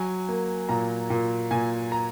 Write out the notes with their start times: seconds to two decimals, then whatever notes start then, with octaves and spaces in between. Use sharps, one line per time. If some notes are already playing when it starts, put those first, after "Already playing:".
Already playing: F#3 G#5
0.29 A#3
0.69 A#2 A#5
1.10 A#2
1.51 A#2 G#5
1.92 A#5